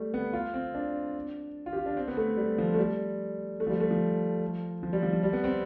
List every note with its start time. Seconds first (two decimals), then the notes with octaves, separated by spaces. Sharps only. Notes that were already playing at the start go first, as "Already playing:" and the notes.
Already playing: G3 A3
0.14 B3
0.33 F4
0.54 C4
0.75 D4
1.66 F4
1.73 G4
1.77 F4
1.86 D4
1.97 C4
2.08 B3
2.17 A3
2.37 G3
2.58 F3
2.74 A3
2.78 G3
3.60 A3
3.67 F3
3.70 G3
3.80 A3
3.91 F3
4.83 F3
4.93 G3
5.03 F3
5.13 F3
5.23 G3
5.33 B3
5.44 C4